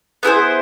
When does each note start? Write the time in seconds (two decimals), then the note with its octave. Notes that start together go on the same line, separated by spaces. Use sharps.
0.23 B3 E4 G#4 C5